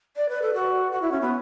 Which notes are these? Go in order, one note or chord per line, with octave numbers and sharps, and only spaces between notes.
D5
B4
A4
F#4
F#4
E4
C#4
B3